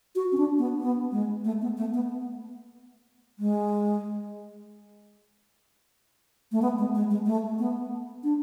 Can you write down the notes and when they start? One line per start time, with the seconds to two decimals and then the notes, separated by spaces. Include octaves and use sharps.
0.15 F#4
0.32 C#4
0.37 D4
0.58 B3
0.80 B3
1.12 G#3
1.44 A3
1.62 B3
1.77 A3
1.93 B3
3.39 G#3
6.52 A3
6.62 B3
6.78 G#3
6.95 G#3
7.10 G#3
7.26 A3
7.59 B3
8.24 D4